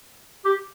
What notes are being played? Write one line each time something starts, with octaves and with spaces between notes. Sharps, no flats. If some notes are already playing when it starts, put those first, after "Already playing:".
G4